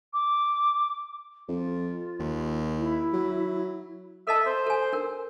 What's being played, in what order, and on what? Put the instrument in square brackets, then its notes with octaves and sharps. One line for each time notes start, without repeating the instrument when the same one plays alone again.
[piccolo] D6
[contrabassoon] F2 [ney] F4
[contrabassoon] D#2
[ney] E4
[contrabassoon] F#3
[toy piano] A4 D#5 A5 [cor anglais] E5
[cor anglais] C5
[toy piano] A4 G#5
D4 A#4